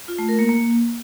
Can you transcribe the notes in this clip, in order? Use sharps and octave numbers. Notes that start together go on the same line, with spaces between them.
F4
A3
A#4
A#3
A#3